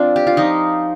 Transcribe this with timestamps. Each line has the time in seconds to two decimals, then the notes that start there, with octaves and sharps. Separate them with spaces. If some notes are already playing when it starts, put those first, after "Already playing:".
Already playing: F3 C4 D4 F4
0.16 G4
0.27 F4
0.37 F3 D#4